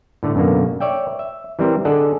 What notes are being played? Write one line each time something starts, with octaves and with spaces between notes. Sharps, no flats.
A2 D3 A3
F#2 B2 D3 A#3
C#5 D5 E5 G5
E5
E3 G3 C4 A#4 C5
D3 G#4 A4 D5 D#5 F#5